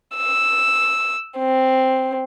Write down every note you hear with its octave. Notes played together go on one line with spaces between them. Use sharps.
E6
C4